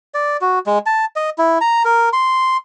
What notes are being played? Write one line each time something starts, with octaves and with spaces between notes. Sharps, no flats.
D5
F#4
G#3
A5
D#5
E4
A#5
A#4
C6